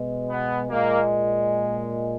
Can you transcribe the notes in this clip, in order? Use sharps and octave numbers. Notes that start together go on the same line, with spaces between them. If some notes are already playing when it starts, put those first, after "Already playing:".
Already playing: B2 G#3
B3
A#2 G#3 A#3